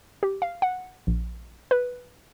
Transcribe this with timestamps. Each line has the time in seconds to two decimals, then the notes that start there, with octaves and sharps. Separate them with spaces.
0.23 G4
0.42 F5
0.62 F#5
1.07 A#1
1.71 B4